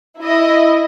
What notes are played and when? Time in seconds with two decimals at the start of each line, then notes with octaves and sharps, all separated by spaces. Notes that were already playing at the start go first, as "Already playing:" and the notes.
0.20 E4 D#5